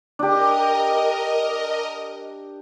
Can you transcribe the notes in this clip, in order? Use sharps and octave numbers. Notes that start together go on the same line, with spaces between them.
D4 G4 A#4 D#5